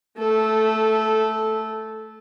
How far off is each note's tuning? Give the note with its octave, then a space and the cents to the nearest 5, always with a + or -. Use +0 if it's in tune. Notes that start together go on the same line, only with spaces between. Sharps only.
A3 +0 A4 -15